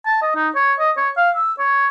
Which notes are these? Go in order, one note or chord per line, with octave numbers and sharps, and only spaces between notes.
A5
D#5
D#4
C#5
D#5
C#5
F5
E6
C#5